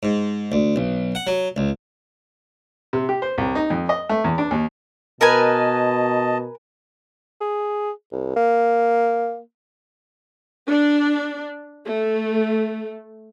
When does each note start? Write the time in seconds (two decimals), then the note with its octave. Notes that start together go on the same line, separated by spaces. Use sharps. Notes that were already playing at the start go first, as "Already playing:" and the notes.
0.03 G#2
0.52 D2
0.76 B1
1.15 F#5
1.27 F#3
1.56 C#2
2.93 C3
3.09 G4
3.22 C5
3.38 C2
3.55 D#4
3.70 F2
3.89 D#5
4.09 A3
4.24 E2
4.38 D4
4.51 D#2
5.21 B2 A#4 B4 D#5 G#5 A5
7.40 G#4
8.12 C2
8.36 A#3
10.68 D4
11.86 A3